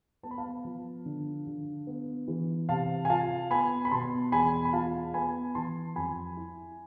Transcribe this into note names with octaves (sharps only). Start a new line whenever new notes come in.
B3 A5
B5
F5 A5
F3
D3
D3
B3
E3
C3 F5 A5
G#5
F4 F5 A5
B3 G#5 B5
B5
B2 A5 C6
E2 G#5 B5
B5
F4 F5 A5
B3 G#5 B5
E3 A5 C6
F2 G#5 B5
E4